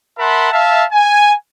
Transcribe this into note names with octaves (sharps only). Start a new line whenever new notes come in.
A#4 E5 F#5 A5 B5 C6
E5 F5 A5
G#5